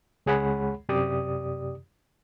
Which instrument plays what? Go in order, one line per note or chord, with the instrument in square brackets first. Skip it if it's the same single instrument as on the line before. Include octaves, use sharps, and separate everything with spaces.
[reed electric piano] C#2 G#3 G#4 C#5 F#5 B5
F#2 C3 G4 D5 D#6